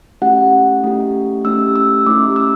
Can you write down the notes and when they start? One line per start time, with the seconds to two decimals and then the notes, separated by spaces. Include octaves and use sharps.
0.22 A3 C#4 E4 G4 F#5
0.84 A3 C#4 E4 G4
1.44 A3 C#4 E4 G4 E6
1.76 E6
2.06 A3 C#4 E4 G4 D6
2.36 E6